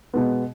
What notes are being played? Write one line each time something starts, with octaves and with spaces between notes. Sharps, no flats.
B2 G#3 B3